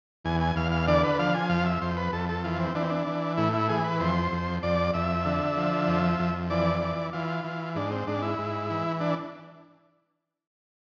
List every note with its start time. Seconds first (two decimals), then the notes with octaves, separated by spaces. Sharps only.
0.25 E2 G#5
0.41 G#5
0.56 E2 F5
0.72 F5
0.88 D3 D5
1.03 B4
1.19 F3 F5
1.34 G#5
1.50 F2 F5
1.65 E5
1.82 F2 C5
1.97 B4
2.13 F2 A4
2.29 A4
2.44 E3 F4
2.59 C4
2.75 E3 D4
2.82 C4
2.90 D4
3.07 E3
3.37 A2 E4
3.53 E4
3.69 E3 G#4
3.84 B4
4.00 F2 C5
4.32 F2
4.63 F2 D5
4.94 F2 E5
5.25 D3
5.57 F3
5.88 F2
6.19 F2
6.50 E3 D5
6.81 E3
7.13 E3 F4
7.44 E3
7.76 G#2 D4
7.91 C4
8.07 G#2 D4
8.22 E4
8.39 G#2
8.70 E3
9.01 D4